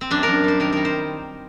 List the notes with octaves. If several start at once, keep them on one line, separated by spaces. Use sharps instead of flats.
C4
F#2 D4
F#2 A#4
G3 C5
D#3 A#4
G3 A#4
C5